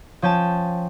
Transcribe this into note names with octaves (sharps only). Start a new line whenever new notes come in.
F3 C#4 G5 A5